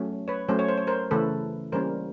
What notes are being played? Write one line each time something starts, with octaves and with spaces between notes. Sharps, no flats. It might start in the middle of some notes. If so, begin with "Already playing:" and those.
Already playing: F#3 A3 C#4
B4 C#5
F#3 A3 C#4 C5
C#5
C5
C#5
A#4 C5
C#3 E3 A3 A4 B4
E3 G3 A#3 C#4 A#4 C5